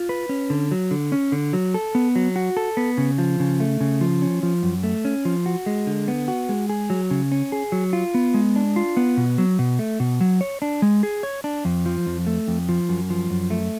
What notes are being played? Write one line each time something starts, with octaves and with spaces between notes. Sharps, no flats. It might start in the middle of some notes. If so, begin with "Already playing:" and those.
Already playing: F4
B4
C#4
D3
F#3
D3
C#4
D3
F#3
A4
B3
F#3
F#4
A4
B3
C#3
F3
C#3
A3
C#3
F3
C#4
F3
F#2
A3
C#4
F3
F#4
G#3
D3
B3
F#4
G#3
G#4
F#3
C#3
C#4
G#4
F#3
F4
B3
G#3
D4
F4
B3
B2
F#3
B2
A3
B2
F#3
C#5
D4
G#3
G#4
C#5
D4
F2
F3
F2
A3
F2
F3
F#2
F3
F#2
A3